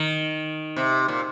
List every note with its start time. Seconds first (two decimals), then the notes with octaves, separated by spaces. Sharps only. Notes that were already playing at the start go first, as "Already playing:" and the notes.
Already playing: D#3
0.77 C3
1.08 A#2